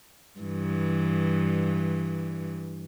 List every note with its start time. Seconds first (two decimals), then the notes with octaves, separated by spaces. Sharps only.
0.40 G2 E3